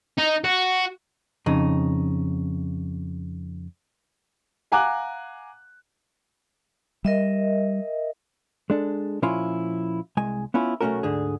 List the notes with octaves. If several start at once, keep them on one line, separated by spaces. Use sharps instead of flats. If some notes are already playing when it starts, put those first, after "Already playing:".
D#4
F#4
F2 C#3 D#4
F5 F#5 G#5 A#5 D6 F#6
G3 A#4 D#5 E5
G#3 D4 A4
A#2 F3 C#4 E4 F4
C2 G#3 G#5
B3 C#4 E4 F4
B1 A3 A#3 C#4 F#4 A#4
D2 G#2 D3 G#4